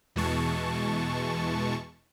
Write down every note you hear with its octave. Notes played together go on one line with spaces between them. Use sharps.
E2 B2 E3 G#3 A5 C#6